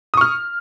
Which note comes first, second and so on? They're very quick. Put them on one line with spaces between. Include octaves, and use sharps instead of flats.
D#6 C#6 F6